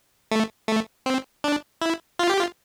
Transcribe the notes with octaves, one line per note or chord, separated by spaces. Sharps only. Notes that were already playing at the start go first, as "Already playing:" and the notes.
A3
A3
C4
D4
E4
F4
G4
F4